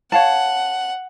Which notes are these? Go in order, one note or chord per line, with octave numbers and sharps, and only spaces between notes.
C#5 F5 F#5 A5